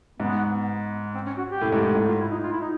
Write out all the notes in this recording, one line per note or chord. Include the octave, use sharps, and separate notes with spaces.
G#2 B3
C4
C#4
F#4
G4
A2
G#2
A2
G#2
F4
E4
D#4
F4
E4
D#4